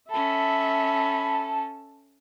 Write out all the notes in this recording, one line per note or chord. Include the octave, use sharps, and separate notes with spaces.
C#4 A4 E5 A5 B5